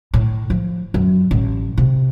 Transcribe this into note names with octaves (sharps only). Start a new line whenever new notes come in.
A2
F3
F#2
A1
C3